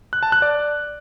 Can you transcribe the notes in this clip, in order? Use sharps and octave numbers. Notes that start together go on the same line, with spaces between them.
F#6
A5
F#6
D5